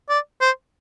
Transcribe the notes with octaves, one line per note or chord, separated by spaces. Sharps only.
D5
C5